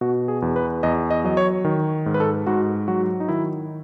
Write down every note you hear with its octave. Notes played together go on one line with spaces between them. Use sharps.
B2 F#4
G#4
E2
B4
E2 D#5
D#5
F#3 D#5
C#5
D#3
G#2
B4
A4
G#2 F#4
F#3 F#4
D#4
D#3 E4